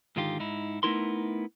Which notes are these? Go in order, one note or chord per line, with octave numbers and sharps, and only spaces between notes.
G#2 D3 D#3 F4 G4
G#2 D#4 E4
A3 B3 D#4 E4 A#4 C6